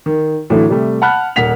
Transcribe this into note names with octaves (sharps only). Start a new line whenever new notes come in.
D#3
A2 D3 E3 F#3 A3
C3 G3 A3
F#5 A5 B5 F6 F#6
D#1 A#3 F#5 B6 F7